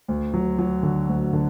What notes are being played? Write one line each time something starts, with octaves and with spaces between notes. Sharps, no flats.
D2
F#3
F#3
D3
D2
D3